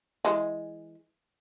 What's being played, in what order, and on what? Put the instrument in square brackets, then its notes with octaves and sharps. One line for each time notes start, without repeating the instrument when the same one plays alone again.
[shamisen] E3 G#3